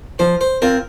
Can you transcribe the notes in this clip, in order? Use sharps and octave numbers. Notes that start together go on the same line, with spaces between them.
F3 C5
C5
C4 F4 A#4